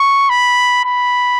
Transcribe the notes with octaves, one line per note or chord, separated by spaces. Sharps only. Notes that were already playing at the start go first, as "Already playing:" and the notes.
Already playing: C#6
B5
B5